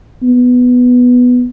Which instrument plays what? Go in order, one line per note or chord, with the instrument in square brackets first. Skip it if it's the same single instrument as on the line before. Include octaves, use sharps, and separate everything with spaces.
[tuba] B3